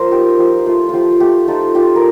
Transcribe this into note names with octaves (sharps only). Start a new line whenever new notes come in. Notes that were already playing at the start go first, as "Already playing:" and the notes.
Already playing: F3 A#4 C5
D#4 G4
F3 G4
A3 F4
F3 F4 G4
A3 G4
D#4 F4 A4
F4 G4
A#4